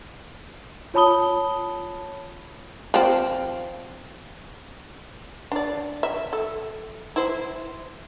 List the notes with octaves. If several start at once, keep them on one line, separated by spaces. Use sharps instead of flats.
F4 C#5 A5 B5 D#6 G7
F3 C4
D4 D5
E5
A4
E4 C5